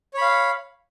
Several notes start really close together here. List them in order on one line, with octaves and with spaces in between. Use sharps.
C#5 B5 F5